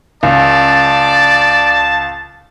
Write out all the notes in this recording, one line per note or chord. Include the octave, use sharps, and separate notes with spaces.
C#2 D5 A5